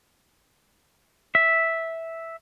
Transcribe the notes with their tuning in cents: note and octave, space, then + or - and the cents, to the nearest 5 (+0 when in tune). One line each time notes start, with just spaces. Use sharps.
E5 -5